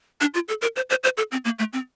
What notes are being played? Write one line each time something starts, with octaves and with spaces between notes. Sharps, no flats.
D4
F4
A4
A#4
C5
C5
C5
A4
C4
A#3
A3
C4